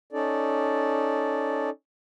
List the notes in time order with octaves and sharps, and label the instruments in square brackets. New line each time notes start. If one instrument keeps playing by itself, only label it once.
[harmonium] C#4 D#4 A4 D5